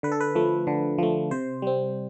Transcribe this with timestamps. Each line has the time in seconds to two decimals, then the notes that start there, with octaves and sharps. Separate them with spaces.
0.03 D3 B4
0.12 A4
0.20 B4
0.35 F3 A3
0.67 D3
0.98 F3 A3
1.31 C3 C5
1.62 G3 C4